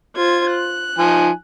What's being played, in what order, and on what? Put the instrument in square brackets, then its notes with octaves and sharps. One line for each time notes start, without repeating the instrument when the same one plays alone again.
[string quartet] F4 C5 G#6
F#6
[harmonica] F3 D#4 G#5